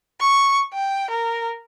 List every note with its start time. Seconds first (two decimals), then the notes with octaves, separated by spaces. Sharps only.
0.20 C#6
0.73 G5
1.10 A#4